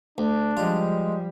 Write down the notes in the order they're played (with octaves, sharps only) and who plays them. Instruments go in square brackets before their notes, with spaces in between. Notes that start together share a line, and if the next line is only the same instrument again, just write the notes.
[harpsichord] D2 [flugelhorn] D4
[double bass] F3 G3 [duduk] G#3 [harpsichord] F4